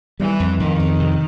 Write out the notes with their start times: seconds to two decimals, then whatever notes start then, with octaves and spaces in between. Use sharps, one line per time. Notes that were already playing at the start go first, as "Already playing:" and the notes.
0.20 E3 G3
0.40 F2
0.60 F2 D#3
0.79 F2
1.00 C3